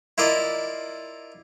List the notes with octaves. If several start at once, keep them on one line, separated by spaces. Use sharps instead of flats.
E4 F4 A#4 D5 D#5